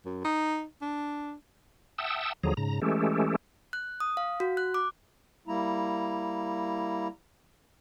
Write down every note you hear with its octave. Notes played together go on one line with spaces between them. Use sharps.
F#2
D#4
D4
E5 F#5 G5 A5 D#6 E6
D#2 D3 F3 F#3 G#4 A#5
G#2 C#3 A#5
E3 G#3 A3 C#4 G4 A4
F#6
D#6
F5
F#4
F#6
D6
G3 A#3 E4 A#5